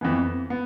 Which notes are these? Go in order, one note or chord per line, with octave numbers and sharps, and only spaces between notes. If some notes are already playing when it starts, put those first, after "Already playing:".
F2 E3 B3
B3